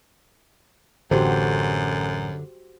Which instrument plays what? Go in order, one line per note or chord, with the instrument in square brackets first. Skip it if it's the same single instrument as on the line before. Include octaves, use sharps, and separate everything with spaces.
[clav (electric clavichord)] A1 [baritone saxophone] F#2 [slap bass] D3 [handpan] F#4 G4 C5